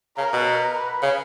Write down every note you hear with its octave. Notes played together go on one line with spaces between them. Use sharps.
C#3 A#4
B2
B4
C#3